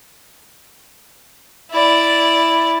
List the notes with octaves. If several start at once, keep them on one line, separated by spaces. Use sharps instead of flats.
E4 D5